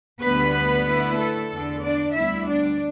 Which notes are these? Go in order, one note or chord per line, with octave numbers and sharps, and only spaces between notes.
D2 D3 G3 B3 B4
D3 A3 E4
A4
E2 D3 B3 D4
D4 D5
D2 D3 G3 B3 E4 E5
D4 D5